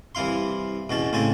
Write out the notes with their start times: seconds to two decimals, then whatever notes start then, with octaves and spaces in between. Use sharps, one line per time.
0.15 C2 E3 E4 F5 C6
0.90 E2 B2 C#4 A5
1.13 A2 C#3 C4 G#5 A5